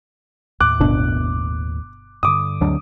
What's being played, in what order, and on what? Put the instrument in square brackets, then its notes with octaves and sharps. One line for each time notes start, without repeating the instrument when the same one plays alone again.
[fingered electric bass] D#2 A2 [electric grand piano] D6 F#6
[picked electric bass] G1 B2 D4
[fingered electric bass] G2 D3 [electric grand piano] D6 D#6
[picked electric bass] D2 F#3 D4